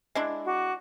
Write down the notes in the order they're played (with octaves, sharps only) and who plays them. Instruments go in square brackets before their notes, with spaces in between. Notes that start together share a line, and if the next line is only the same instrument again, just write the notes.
[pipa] G#3 D4 E4
[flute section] F#4 D6